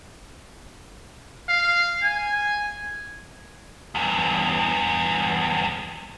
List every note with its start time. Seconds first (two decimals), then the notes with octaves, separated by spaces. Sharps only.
1.49 F5
2.03 G#5
3.95 E2 G2